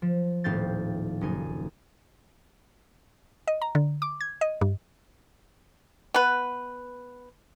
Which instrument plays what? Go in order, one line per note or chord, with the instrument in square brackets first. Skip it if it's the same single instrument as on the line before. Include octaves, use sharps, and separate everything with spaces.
[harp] F3
D#1 A2 C4 F5 G6 A6
F#1 D#4 G#5
[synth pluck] D#5
A#5
D3
D6
G#6
D#5
G2
[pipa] B3 B4